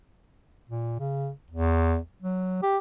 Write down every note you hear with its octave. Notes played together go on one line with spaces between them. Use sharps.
A#2
C#3
E2
F#3
G4